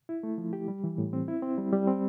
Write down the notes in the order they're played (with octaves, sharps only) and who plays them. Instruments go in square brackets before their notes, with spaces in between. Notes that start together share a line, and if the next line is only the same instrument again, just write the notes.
[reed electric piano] E4
A3
F3
G4
G3
E3
A2
C4
E4
C4
G3
G3
C4